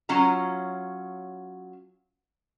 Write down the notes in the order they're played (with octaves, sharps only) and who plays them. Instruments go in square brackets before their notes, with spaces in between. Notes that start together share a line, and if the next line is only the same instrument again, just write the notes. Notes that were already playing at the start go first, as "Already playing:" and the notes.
[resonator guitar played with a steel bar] F#3 C#4 F4 A#5